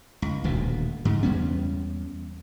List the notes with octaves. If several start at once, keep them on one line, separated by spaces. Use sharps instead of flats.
C#2
D#1 D2 B2
G#2 C#3
E2 G3 B3 C#4